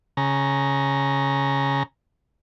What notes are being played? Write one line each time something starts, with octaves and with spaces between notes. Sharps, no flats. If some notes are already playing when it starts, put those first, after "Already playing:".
C#3 A#5